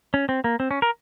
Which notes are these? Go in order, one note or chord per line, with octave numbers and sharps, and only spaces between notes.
C#4
C4
A#3
C4
C#4
A#4